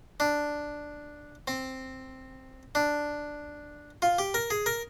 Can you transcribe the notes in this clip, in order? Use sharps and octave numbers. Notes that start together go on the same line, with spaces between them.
D4
C4
D4
F4
G4
A#4
G#4
A#4